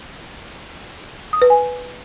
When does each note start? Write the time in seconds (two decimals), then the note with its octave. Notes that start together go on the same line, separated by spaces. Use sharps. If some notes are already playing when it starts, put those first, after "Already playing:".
1.33 D#6
1.42 B4
1.50 G#5